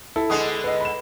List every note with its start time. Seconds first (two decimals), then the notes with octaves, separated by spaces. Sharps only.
0.16 E4 A4
0.30 D3 G#3 B3 D#6
0.64 B4 D#5
0.81 B5 E7